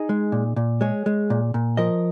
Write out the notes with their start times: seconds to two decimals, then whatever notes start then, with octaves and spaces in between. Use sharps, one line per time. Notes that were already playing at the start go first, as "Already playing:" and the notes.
Already playing: D#4 G#4
0.09 G#3
0.32 A#2
0.56 A#2
0.81 G#3 G#4 C#5
1.06 G#3
1.30 A#2
1.54 A#2
1.77 F3 A#4 D#5